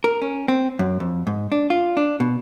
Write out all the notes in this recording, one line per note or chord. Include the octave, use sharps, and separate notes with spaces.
A#4
C#4
C4
F#2
F2
G#2
D4
F4
D4
B2